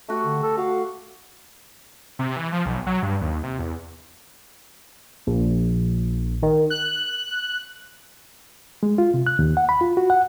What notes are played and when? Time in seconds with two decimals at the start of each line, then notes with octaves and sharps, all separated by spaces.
0.09 A3 F#4 G4
0.25 D3
0.43 A4
0.57 F#4 F5
2.19 C3
2.36 E3
2.52 F3
2.66 B1
2.87 F#3
3.03 G2
3.21 D#2
3.43 C3
3.59 E2
5.27 A#1
6.42 D#3
6.70 F#6
8.83 G#3
8.98 F4
9.14 C3
9.27 F#6
9.39 D#2
9.57 F#5
9.69 B5
9.81 F4
9.97 F#4
10.10 F#5